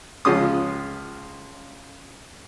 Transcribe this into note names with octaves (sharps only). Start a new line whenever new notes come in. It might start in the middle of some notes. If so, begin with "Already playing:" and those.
C#2 F3 G#3 C#4 F4 D#6